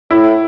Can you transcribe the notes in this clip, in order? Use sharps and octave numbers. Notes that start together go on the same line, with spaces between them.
A2 E4